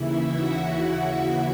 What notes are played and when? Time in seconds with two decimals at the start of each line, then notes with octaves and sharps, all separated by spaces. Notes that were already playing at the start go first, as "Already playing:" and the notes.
Already playing: D#2 C#3 E3 E4 E5
0.34 F#4 F#5
0.81 E4 E5
1.12 E4 E5